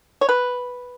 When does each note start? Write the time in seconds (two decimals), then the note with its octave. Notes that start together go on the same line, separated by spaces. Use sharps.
0.21 C#5
0.29 B4